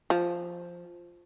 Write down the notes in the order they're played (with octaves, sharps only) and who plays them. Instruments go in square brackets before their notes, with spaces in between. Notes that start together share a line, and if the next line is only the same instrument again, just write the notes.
[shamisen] F3